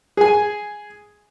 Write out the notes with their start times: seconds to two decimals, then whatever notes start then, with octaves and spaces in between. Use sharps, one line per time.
0.17 G#4 G#5